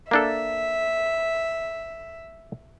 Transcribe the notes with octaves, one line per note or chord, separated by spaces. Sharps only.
A#3 D4 A4 E5